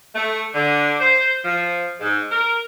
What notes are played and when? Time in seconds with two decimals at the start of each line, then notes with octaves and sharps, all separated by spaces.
0.15 A3
0.54 D3
1.01 C5
1.45 F3
2.00 G#2
2.32 A#4